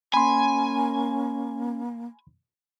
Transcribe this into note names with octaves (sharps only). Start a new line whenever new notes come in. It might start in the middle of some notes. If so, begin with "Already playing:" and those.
A#3 C#4 G#5 B5 C6